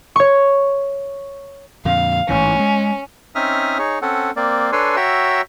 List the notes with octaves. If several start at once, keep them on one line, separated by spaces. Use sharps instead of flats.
C#5 C#6
F2 A#2 D3 F5
A1 G#2 E3 C#4
G#3
C4 C#4 D#4 E5 D#6 F6
D#4 G#4 C#5
C4 C#4 A4 F#5
A#3 C4 D5
D4 A4 B4 C#5 G#5 C6
F#4 C#5 E5 G5 A#5 E6